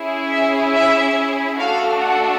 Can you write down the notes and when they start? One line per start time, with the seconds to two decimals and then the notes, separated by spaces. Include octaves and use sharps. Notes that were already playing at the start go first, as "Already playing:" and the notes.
Already playing: C#4 E4 G#4
0.32 E5
0.74 E5
1.59 A3 D4 F#4 A4 F5
2.00 F#5